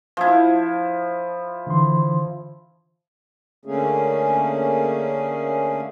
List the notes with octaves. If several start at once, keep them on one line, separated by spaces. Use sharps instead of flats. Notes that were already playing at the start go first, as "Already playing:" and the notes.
F3 E4
D3 E3 C6
D3 A3 A#3 C#4 G#4